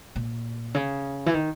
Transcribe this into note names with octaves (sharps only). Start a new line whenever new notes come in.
A#2
C#3
E3
D#3